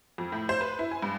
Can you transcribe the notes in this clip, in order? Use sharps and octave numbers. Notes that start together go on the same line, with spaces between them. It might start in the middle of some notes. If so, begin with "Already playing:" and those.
F2
A2
C5
B4
E4
G#5
G2